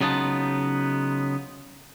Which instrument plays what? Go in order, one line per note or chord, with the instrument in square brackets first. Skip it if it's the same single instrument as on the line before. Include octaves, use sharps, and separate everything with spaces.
[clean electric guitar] C#3 F#3 B3 D#4 F4 A5